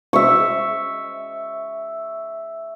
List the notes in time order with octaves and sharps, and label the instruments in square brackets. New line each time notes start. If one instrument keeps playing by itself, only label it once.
[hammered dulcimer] E5 C#6